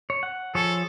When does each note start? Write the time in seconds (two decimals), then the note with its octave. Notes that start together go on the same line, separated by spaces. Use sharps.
0.10 C#5
0.23 F#5
0.55 F3 G#4 A4 C#5